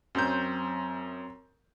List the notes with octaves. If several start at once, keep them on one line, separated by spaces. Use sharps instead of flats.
F#2 F#3 C4 C5 G6